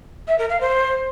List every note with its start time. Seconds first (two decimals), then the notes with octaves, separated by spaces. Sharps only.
0.28 E5
0.39 A#4
0.50 F5
0.61 C5